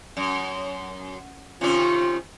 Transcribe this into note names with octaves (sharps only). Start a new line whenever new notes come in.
F#2
C3 D#3 C#4 F4